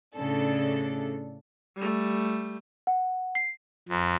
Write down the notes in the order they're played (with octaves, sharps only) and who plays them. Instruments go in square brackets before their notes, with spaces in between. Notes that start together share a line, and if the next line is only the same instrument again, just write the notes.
[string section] A2 C#3 D4 A4
[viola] G3 A3
[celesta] F#5
C7
[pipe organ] F2